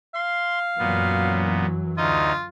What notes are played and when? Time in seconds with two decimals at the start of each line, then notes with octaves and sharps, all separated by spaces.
0.15 F5 C6
0.79 F#2 A#2 E3 F#3 B3
1.97 D2 D#4 F4 D#5